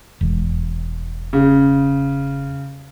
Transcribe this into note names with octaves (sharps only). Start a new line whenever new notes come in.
E1
C#3